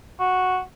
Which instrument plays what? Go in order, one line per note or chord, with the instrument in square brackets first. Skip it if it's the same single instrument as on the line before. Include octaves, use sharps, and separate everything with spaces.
[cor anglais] F#4